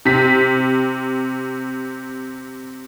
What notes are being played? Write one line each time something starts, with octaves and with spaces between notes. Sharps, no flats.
C3 B6